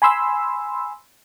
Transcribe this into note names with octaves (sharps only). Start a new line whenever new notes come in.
G#5 B5 C6 E6